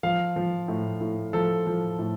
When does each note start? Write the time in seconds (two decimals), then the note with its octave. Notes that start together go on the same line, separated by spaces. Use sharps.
0.03 F3 F5
0.36 F3
0.68 A2
1.01 A2
1.33 F3 A4
1.67 F3
1.99 A2